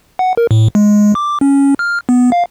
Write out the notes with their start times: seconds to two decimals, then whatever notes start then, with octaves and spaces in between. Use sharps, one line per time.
0.19 F#5
0.37 A#4
0.51 A2
0.75 G#3
1.15 D6
1.41 C#4
1.79 F6
2.09 B3
2.32 F5